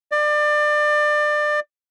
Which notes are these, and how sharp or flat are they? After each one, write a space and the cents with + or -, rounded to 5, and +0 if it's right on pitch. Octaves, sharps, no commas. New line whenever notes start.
D5 +30